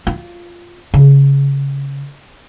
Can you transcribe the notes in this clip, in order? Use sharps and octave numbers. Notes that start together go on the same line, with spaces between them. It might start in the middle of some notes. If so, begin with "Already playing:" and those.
F4
C#3